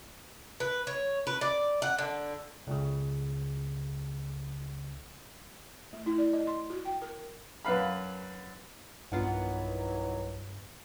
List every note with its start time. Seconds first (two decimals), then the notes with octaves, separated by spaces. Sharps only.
0.60 B4
0.87 C#5
1.27 B4
1.41 D5
1.82 F#5
1.98 D3
2.67 C#2 C#3
5.93 A3
6.06 E4
6.18 D5
6.33 D#5
6.47 C6
6.70 F#4
6.85 G5
7.02 A#4
7.65 F#2 B4 F5 B5
9.12 B1 G2 D#3 E3 F#3 B3 F4 F#5